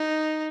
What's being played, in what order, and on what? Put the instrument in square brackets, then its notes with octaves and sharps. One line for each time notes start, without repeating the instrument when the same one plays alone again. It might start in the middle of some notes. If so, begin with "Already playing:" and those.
Already playing: [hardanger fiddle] D#4